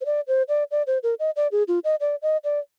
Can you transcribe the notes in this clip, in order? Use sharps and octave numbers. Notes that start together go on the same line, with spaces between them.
C5
D5
C5
D5
D5
C5
A#4
D#5
D5
G#4
F4
D#5
D5
D#5
D5